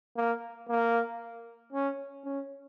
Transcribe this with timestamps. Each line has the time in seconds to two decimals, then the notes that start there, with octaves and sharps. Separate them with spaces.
0.17 A#3
0.69 A#3
1.73 C#4
2.25 C#4